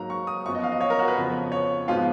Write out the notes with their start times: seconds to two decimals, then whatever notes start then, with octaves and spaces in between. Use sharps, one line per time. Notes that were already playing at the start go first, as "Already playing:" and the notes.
Already playing: G#2 F#3 A#3 A#5
0.10 C#6
0.27 D#6
0.46 F#2 F3 B3 C#6
0.55 D#5
0.63 F5
0.72 D#5
0.81 C#5
0.90 A#4
0.99 F#4
1.08 B4
1.17 F2 C#3 F3 B3
1.52 C#5
1.88 G#2 F3 G#3 B3 F4